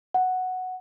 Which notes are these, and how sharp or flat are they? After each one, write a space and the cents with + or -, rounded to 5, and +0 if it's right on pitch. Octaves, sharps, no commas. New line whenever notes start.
F#5 +0